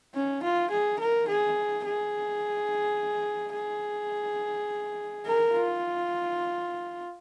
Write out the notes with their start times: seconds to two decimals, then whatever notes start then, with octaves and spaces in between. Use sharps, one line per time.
0.15 C#4
0.43 F4
0.71 G#4
0.99 A#4
1.28 G#4
1.85 G#4
3.55 G#4
5.26 A#4
5.54 F4